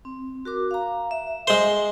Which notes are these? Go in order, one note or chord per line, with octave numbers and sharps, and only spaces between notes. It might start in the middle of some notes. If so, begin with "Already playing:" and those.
C4
F#4 A#4 D6
F5 A#5
E5
G#3 C5